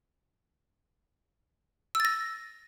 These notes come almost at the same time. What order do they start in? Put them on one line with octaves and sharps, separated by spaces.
E6 A6 A#6